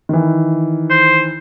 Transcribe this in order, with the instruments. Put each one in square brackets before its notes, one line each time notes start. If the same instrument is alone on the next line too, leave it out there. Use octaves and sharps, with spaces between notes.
[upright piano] D#3 E3
[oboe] C5